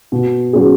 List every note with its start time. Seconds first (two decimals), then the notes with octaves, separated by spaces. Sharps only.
0.12 B2
0.53 F#3 C#4 G#4